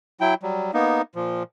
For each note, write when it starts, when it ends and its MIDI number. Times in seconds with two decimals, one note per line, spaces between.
0.21 0.34 54
0.21 0.34 64
0.21 0.34 79
0.43 0.71 54
0.43 0.71 55
0.74 1.02 58
0.74 1.02 59
0.74 1.02 63
1.16 1.43 46
1.16 1.43 53